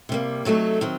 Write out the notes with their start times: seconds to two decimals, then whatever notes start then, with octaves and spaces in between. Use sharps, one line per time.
0.09 C3 G3 A#3
0.45 C3 F#3 A3 D#4 A4
0.81 D#3 F#3 C4